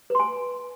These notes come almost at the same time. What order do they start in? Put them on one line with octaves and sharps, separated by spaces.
B4 C6 G#5